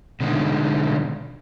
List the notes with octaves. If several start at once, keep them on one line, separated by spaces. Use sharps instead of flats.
B2 D3 D#3 G#3